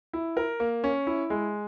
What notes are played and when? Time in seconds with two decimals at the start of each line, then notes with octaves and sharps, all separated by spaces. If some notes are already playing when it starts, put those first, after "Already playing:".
0.13 E4
0.37 A#4
0.60 A#3
0.84 C#4
1.07 E4
1.30 G#3